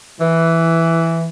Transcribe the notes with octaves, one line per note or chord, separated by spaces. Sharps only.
E3